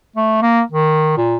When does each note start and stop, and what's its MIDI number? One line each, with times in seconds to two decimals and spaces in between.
0.16 0.38 57
0.42 0.62 58
0.72 1.14 51
1.17 1.37 46